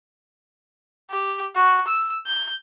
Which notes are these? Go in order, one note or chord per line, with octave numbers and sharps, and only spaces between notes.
G4
F#4
E6
G6